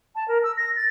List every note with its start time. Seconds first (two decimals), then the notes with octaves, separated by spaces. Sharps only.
0.16 A5
0.28 A#4
0.44 E6
0.57 A#6
0.76 A6